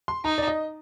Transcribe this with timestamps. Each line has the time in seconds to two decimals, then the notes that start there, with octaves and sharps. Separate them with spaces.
0.08 C6
0.24 D#4 A#5
0.38 D5
0.48 D#5